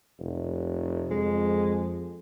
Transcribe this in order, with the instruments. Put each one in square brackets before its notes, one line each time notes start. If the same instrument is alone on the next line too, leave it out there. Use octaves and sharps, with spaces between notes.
[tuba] F1
[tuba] F2 [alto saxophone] G#3